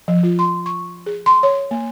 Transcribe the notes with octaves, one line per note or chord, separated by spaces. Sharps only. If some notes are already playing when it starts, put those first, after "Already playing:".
F3
F4
C6
C#6
G#4
C6
C#5
A#3